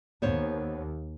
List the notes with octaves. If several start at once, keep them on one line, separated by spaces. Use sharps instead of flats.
D#2 B3 C5 C#5